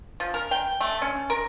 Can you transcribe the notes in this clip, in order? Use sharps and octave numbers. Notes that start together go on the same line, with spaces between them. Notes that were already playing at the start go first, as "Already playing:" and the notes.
F3
A#4
G5
A3
C#4
A#4